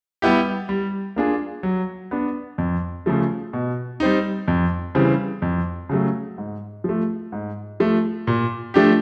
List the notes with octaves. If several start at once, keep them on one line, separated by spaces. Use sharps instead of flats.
G3 B3 E4 G4
G3
A#3 D4 F4 G#4
F#3
B3 D4
F2
C#3 F3 A3
B2
G3 C4 D#4
F2
C#3 E3 G3 C4
F2
C#3 F#3 A3
G#2
F3 A3
G#2
F3 A3
A#2
F3 A3 D4 G4